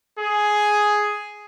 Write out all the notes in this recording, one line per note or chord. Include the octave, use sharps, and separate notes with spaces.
G#4